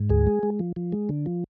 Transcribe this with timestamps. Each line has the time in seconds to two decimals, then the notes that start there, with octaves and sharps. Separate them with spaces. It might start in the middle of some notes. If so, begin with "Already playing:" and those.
Already playing: G#2
0.10 D2 G#4
0.27 G#3
0.43 G#3
0.59 F3
0.76 F3
0.92 G#3
1.09 D3
1.26 F3